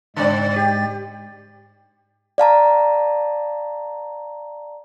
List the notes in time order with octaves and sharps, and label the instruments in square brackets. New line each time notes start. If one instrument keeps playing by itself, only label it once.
[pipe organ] G#2 G#3 A6 [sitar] C#3 C4 D5
[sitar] G4
[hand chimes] D5 F5 A5 A#5